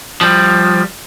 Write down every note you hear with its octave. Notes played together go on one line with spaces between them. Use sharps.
F3 G3